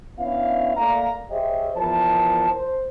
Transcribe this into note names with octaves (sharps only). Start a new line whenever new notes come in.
B3 C#4 D4 E4 E5 F5
A3 A#3 D5 F5 A#5
G4 G#4 C5 C#5 D#5 E5
E2 F3 E4 A#4 A5
C5